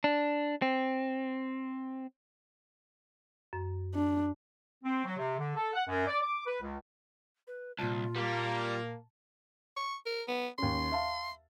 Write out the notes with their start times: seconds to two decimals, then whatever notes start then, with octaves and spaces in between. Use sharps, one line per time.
0.04 D4
0.62 C4
3.53 F#2
3.95 D4
4.83 C4
5.05 F#3
5.17 C3
5.38 D3
5.54 A4
5.74 F#5
5.88 F#2
6.07 D5
6.21 D6
6.46 B4
6.61 C#2
7.47 B4
7.79 C2 A#2 F4 A5
8.16 G3 A#3
9.77 C#6
10.06 A#4
10.28 B3
10.58 D#2 C#4 C6
10.92 E5 F5 A5